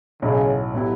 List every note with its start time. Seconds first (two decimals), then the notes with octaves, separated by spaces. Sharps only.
0.22 B1 A2 C#3 F#3 C#4 E4
0.73 A2 F#3 B3 E4 G4